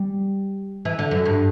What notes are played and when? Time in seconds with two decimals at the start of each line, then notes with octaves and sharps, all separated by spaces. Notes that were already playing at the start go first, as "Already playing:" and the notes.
Already playing: G3
0.85 E3
0.99 D3
1.11 F#2
1.25 G2